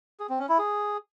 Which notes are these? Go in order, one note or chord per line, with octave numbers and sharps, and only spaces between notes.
G#4
C4
C#4
E4
G#4